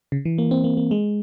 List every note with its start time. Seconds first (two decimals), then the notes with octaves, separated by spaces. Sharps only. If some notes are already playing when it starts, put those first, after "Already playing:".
0.12 C#3
0.25 E3
0.38 A#3
0.51 C4
0.64 A#3
0.77 A#3
0.91 G#3